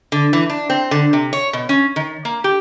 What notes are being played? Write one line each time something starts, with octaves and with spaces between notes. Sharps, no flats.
D3
E3
D4
C4
D3
C3
C#5
B2
C#4
D#3
A#3
G4